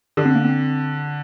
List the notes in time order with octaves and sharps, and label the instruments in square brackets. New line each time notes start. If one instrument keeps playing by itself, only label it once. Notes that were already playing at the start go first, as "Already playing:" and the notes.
[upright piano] D3
[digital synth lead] C4
A#3
C4